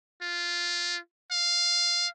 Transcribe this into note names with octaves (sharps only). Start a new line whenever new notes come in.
F4
F5